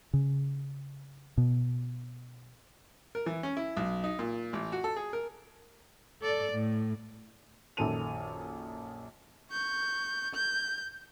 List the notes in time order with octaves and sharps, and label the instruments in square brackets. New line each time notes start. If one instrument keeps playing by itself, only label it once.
[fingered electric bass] C#3
B2
[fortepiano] A#4
E3
C#4
E4
B1
D#4
A#2
A1
F#4
A4
G#4
A#4
[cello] A4 D5
A2
[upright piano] A#1 F#2 D#3 A4 D#7 F7
[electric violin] C#6 G6
G6